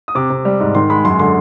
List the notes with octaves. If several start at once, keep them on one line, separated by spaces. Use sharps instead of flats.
D#6
C3 D6
C3
G3
G#2
D#3 C6
G#3 B5
F#2 C6
D3 C6